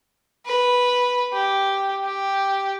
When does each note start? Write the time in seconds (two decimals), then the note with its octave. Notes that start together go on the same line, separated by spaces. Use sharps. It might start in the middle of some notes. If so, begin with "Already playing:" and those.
0.46 B4
1.33 G4
2.04 G4